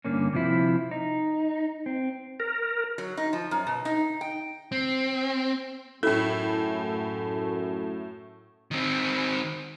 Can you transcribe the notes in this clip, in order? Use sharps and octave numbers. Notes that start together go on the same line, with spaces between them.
G2 D3 A#3 C#4
C3 F3 E4
D#4
C4
A#4
F#3
D#4
F3
F#2
B2
D#4
G5
C4
F#2 A2 A3 E4 A4
D#3 C4